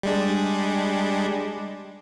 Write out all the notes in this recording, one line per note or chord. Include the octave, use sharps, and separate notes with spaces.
G3 G#3 D4